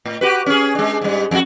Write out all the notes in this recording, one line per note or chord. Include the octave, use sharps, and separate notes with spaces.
A2
F#4 G4 B4
C#4 G#4
G#3 D4
G#2 G3
F2 F#4